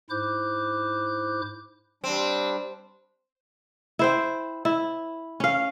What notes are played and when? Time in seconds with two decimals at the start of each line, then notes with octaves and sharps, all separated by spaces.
0.10 G#2 E4 C5 D6 F#6 G6
2.04 G3 C4 D4
3.99 E4 C5 G5
4.65 E4
5.40 C#4 F5